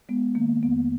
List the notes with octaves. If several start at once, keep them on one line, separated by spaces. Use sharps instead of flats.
G#3 B3
D#3 A#3
F2 B3